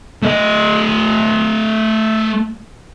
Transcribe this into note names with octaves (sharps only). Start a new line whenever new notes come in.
A3 D#5